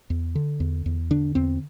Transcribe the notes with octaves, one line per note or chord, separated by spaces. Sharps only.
E2
D3
E2
E2
D3 D4
E2 C4